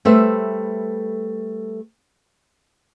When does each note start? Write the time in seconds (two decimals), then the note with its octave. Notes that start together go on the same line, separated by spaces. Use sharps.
0.05 G3 A3 B4 C5 E5